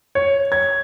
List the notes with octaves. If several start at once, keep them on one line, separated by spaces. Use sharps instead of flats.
C#5
G#6